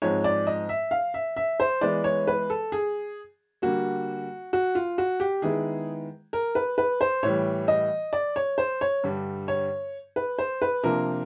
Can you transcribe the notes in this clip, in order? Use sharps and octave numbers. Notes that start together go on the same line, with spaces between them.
G#2 F3 G#3 C4 C#5
D5
D#5
E5
F5
E5
E5
C5
E3 G#3 B3 D5
C#5
B4
A4
G#4
D3 G3 A#3 F#4
F#4
F4
F#4
G4
D#3 G#3 B3 E4 G#4
A#4
B4
B4
C5
A2 E3 G3 C#5
D#5
D5
C#5
C5
C#5
G2 D3 G3
C#5
B4
C5
B4
C3 F3 A#3 D4 F4 A#4